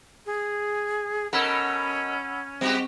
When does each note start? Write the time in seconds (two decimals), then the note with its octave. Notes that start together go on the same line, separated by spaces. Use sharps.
0.26 G#4
1.33 B2 C#4 A4 A#4 F#5 B5 E6
2.61 G3 C4 F#4 G4